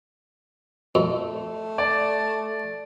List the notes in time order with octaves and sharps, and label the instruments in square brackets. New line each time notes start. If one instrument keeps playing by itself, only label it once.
[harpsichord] F2 [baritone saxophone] A3
[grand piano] D5